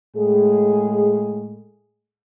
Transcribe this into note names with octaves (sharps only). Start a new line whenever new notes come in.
A2 G#3 G#4